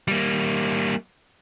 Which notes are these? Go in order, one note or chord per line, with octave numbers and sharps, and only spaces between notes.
G3 A#3